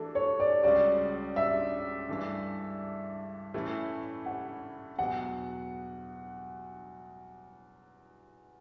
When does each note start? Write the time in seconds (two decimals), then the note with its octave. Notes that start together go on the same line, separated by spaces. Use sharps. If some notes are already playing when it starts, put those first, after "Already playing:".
Already playing: E3 A3 D4 F#4 A4
0.15 C#5
0.40 D5
0.63 C#2 C#3 G3 C#4 F#4 D5
1.36 E5
2.09 G2 E3 A3 D4
3.54 A2 E3 A3 C#4 E4
4.26 F#5
4.99 E2 B2 F#3 F#5